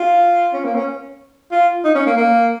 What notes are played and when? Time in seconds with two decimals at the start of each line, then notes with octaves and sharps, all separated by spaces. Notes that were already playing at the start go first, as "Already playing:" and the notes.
Already playing: F4
0.54 C#4
0.65 A#3
0.75 C#4
1.52 F4
1.85 D#4
1.95 C#4
2.07 A#3
2.17 A#3